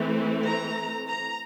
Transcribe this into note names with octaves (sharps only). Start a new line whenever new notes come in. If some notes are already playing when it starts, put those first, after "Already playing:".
Already playing: E3 A3 C4
A#5
A#5